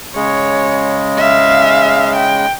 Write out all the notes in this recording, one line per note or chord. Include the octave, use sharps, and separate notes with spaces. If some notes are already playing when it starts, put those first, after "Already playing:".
C#3 G#3 C#5
E5 F5
G5